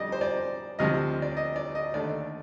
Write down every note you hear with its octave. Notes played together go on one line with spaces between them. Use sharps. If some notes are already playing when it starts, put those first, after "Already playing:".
Already playing: F2 D3 G3 D5 D#5
C5
D5
D2 C3 F3 D#5
D5
D#5
D5
D#5
D#2 D3 A3 D5